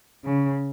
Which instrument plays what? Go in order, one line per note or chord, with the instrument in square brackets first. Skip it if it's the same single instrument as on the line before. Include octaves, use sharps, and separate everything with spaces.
[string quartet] C#3